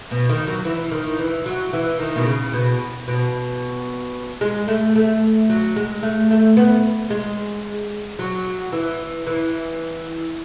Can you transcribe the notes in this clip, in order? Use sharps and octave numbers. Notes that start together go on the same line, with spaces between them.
B2
D#3
F#3
E3
D#3
E3
F#3
E3
D#3
B2
C#3
B2
B2
G#3
A3
A3
F#3
G#3
A3
A3
B3
G#3
F#3
E3
E3